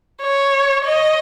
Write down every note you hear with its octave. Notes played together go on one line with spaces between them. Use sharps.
C#5
D#5